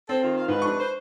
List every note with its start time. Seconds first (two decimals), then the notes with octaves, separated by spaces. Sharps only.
0.09 C4 A4 C5
0.23 D#3 F4
0.36 F5
0.48 G#2 B4
0.62 F2 C3 D4 C#6
0.78 C5